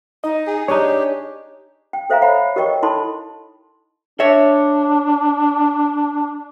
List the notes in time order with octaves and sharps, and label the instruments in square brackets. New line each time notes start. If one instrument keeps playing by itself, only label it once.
[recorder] D#4 [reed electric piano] D#5
[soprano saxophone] G#4
[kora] D4 D#4 [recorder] G4 [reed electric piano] C#5
[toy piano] G5
A4 C5 E5 F5 G#5 A#5
C#5 F#5 B5
G4 A#4 C#5 D#5 G5 C#6
D#4 E4 A4 A5 B5 C6
[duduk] D4 [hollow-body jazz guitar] C#5 E5